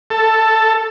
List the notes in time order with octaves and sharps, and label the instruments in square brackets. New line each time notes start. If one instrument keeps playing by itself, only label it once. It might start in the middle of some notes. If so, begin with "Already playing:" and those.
[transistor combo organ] A4